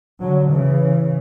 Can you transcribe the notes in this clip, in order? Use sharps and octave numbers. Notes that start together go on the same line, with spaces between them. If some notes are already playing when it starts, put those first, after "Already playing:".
D3 F#3
C#3 E3